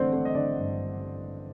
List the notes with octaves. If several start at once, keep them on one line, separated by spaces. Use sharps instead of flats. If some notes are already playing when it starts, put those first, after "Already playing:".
Already playing: A1 D3 A3 C4 D4 C5 D5 F#5
A3 C4 C5
D#5
D3 D4 D5
G2